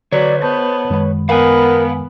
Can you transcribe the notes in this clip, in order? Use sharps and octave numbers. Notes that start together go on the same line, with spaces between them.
D3 F#3 B4 C#5 D5
B3 C5 A5 C#6 G6
F#2 D#3 G#3
B3 A#4 F5 F#5 G#5